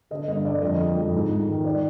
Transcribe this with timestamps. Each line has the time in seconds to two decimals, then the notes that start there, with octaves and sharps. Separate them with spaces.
0.11 D3 D#5
0.28 G2 D#5
0.45 D3 D5
0.62 F2 D#5
0.80 F2
0.97 F2
1.14 G#2
1.31 G#2
1.48 D#3
1.65 D5